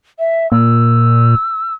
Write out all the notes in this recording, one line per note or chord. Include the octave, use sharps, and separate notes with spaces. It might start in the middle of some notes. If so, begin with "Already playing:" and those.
E5
A#2 E6